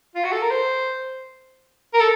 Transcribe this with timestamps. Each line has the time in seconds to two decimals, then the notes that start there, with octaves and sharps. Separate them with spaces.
0.15 F4
0.24 F#4
0.32 A4
0.41 A#4
0.50 C5
1.94 A#4
2.00 A4